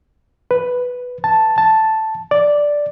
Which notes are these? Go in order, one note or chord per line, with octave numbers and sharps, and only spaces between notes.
B4
A5
A5
D5